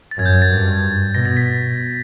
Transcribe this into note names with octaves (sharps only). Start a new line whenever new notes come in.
A6
F#2 G#6
G6
G#6
A6
G2
B2 A#6
A6
B6